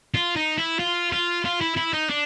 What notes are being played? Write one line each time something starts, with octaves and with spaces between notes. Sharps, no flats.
F4
D#4
E4
F4
F4
F4
E4
E4
D#4
D4